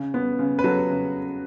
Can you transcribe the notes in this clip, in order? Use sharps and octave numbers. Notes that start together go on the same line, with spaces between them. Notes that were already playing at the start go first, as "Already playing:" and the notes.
Already playing: C#3
B3
C#3
B4
F#3 F#4 A4
C#3